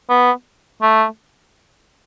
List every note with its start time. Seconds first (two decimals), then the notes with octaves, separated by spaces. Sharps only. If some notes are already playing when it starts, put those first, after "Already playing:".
0.09 B3
0.82 A3